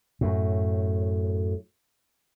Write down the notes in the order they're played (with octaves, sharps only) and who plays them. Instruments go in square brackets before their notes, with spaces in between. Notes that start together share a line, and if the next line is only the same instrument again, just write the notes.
[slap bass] F#2 A2